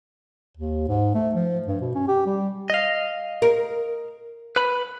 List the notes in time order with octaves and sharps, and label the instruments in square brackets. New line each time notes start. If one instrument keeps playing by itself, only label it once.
[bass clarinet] D#2
G#2
A3
F3
G2
B2
C#4
G4
G3
[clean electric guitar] D#5 F5
[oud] A#4
[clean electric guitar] B4 B5